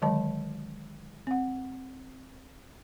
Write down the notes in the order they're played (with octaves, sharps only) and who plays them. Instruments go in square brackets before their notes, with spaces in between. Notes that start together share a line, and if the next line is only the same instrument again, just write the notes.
[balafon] D3 D#3 F#3 G#3 D#5 A5
C4 F#5